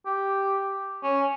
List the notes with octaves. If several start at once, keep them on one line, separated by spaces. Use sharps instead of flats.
G4
C#4